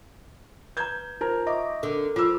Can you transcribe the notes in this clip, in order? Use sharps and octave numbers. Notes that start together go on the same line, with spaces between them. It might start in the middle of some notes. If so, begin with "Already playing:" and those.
B4 A#5 G6 G#6
D#4 F4 A#4 C5 A#5
D#5 E5 C#6 D6
D3 A#4
F3 F4 C5 D6 E6